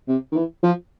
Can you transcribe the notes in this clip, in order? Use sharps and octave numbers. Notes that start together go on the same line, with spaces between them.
C3
D#3
E3
F3